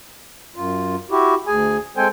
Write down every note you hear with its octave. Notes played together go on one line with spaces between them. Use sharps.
F#2 F4
E4 F#4 G4
D2 G#4 G#5
G#3 C4 A4 C5 G5 G#5